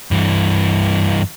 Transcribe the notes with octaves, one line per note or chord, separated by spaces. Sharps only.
G2 E3